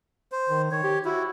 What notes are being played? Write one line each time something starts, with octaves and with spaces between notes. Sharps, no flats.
C5
D#3
D#3 C#5
G4
E4 F#4